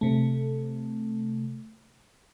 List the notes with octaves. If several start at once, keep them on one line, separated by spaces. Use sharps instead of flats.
C3 A3